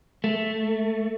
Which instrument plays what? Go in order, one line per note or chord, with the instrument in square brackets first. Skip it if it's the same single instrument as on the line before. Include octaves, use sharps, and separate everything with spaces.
[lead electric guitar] A3